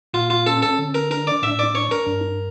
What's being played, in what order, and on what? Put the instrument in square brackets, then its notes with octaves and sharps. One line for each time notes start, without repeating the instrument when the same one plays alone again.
[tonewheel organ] A#2 [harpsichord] F4
[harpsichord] F4
[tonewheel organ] C#4 [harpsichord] A4
[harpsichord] A4
[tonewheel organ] D3
[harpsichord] A#4
[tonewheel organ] D4 [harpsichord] A#4
[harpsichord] D5
[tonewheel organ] A2 [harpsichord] E5
[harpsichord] D5
[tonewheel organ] D4 [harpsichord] C#5
[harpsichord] A#4
[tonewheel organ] G2